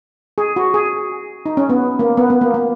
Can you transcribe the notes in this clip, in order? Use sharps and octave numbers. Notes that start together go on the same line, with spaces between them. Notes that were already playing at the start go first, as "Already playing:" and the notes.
G#4
F#4
G#4
D#4
C#4
B3
A#3
B3
B3
A#3
A#3